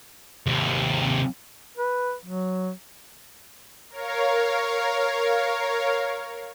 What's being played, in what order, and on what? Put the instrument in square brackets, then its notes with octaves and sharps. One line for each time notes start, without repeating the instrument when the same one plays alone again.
[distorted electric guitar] D#2 C3
[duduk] B4
F#3
[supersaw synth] A#4 C#5 F5